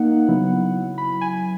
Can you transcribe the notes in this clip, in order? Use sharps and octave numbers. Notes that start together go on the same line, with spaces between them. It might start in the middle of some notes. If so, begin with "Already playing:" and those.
Already playing: A#3 D#4 F#5
C#3 F#3 B3 E4
B5
G#5